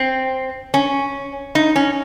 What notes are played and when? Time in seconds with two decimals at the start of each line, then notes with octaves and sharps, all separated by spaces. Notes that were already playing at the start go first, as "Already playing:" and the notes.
Already playing: C4
0.74 C#4
1.55 D#4
1.76 C#4